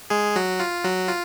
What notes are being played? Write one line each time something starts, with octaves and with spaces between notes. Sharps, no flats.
G#3 G#4
F#3 F#4
F4
F#3 F#4
F4